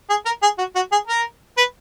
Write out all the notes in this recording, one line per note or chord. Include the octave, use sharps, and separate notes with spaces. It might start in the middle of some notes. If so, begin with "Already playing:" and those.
G#4
A#4
G#4
F#4
F#4
G#4
A#4
B4